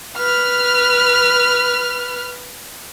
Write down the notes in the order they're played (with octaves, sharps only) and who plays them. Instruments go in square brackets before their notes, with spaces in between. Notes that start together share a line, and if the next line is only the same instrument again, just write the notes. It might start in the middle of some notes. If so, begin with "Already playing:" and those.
[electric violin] B4 F6